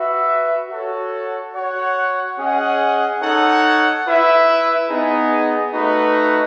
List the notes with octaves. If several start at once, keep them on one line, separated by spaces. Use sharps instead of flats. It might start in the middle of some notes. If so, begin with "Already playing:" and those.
Already playing: F#4 B4 E5
F#4 A4 C#5
F#4 C#5 F#5
C#4 G#4 D#5 F#5
D#4 A4 C#5 F#5
E4 B4 E5
B3 D#4 G#4
A3 D#4 F#4 B4